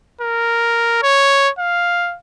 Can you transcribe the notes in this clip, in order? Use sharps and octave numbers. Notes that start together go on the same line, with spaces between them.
A#4
C#5
F5